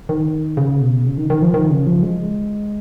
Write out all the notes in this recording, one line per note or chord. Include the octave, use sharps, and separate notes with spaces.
D#3
C#3
B2
C#3
D#3
D#3
F3
D#3
C#3
F3
G#3